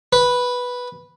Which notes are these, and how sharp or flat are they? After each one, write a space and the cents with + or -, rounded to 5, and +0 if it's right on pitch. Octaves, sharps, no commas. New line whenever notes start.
B4 -5